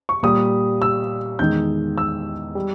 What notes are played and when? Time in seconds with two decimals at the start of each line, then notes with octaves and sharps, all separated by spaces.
0.09 C#6
0.23 A#2 G3 D#6
0.82 E6
1.39 E2 D#3 G#3 G6
1.98 E6
2.55 G3